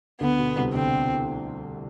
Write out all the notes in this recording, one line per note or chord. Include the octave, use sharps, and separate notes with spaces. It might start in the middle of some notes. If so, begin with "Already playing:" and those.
D2 D3 B3
B2
C2 C3
D2 D3 C4